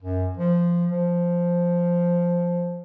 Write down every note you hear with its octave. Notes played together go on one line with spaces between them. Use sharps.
F#2
F3
F3